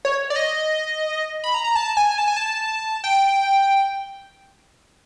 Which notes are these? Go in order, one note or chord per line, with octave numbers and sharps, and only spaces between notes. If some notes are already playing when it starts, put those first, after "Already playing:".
C#5
D5
D#5
B5
A#5
A#5
A5
G#5
A5
G#5
A5
G5